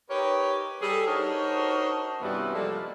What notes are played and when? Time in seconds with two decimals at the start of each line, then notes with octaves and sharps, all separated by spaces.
0.09 D#4 G4 A#4 B4 C#5
0.82 G3 G#4 A4
1.06 D4 D#4 F#4 A#4 C5 C#5
2.22 G2 C3 E3 G3 B3 F#4
2.55 F3 G3 G#3 A#3 A4 D5